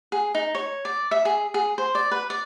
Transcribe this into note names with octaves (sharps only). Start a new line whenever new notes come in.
G#4
D#4
C#5
D5
E5
G#4
G#4
C5
D5
B4
D5